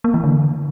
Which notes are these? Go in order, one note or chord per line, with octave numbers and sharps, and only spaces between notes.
A#3
E3
D3